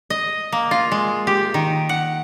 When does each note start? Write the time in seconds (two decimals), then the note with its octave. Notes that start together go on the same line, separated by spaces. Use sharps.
0.10 D#5
0.52 A#3
0.71 F4
0.92 G#3
1.27 G4
1.54 D#3
1.89 F#5